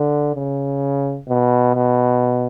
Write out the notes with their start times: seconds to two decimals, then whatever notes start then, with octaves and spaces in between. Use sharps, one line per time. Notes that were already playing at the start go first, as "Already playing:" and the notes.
Already playing: D3
0.35 C#3
1.28 B2
1.75 B2